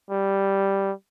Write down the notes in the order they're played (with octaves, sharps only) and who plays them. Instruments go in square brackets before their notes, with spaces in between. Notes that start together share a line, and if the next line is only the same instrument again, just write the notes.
[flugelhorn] G3